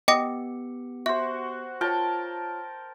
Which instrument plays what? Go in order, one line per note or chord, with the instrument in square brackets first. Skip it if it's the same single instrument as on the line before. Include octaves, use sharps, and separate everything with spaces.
[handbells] B3 G4 C#7 [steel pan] D#5 [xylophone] G5 D6 A#6
[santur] F#4 C5 [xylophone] E5
[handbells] F4 C#5 [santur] A#4 G5 A5